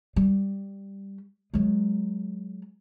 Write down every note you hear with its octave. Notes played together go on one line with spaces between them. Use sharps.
G3
F#3 G#3